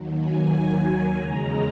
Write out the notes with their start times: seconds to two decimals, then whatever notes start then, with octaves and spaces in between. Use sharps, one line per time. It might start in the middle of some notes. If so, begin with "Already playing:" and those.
Already playing: D#2 D#3 F#3
0.22 G#5
1.15 E2 C#3 G#3 A#5